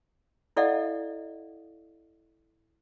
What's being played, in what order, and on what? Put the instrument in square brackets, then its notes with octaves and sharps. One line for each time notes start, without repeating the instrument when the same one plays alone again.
[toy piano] E4 A4 D5 D#5 F5 F#5